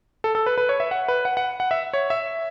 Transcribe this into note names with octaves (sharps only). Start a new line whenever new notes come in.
A4
A4
B4
B4
C#5
E5
F#5
B4
F#5
F#5
F#5
E5
C#5
E5